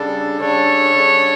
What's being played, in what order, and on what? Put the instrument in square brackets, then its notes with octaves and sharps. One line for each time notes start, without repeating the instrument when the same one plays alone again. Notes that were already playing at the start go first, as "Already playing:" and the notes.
Already playing: [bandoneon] C#3 G3 D4 A4
[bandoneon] C#3 G3 D4 A4 [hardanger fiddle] C#5
[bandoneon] C#3 G3 D4 A4